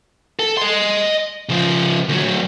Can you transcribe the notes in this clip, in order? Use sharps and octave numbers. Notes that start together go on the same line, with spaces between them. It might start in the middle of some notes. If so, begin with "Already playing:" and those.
A4
D#5 C6
C#3 F3
D2 F#3